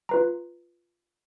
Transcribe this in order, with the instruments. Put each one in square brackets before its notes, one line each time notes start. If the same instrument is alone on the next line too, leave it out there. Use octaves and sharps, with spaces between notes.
[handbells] F4 B4 A#5